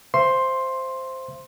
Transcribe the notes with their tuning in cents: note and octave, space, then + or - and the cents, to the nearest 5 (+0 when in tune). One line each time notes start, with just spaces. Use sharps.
C5 +0 E5 +45 C6 +10